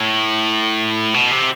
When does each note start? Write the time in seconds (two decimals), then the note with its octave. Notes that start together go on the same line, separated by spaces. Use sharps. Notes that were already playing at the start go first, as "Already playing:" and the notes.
Already playing: A2
1.14 B2
1.31 C3